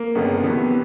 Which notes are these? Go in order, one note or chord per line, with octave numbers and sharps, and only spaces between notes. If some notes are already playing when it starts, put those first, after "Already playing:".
Already playing: A#3
G1 F2 C#3 F#3 B3
E2 C3 E3 B3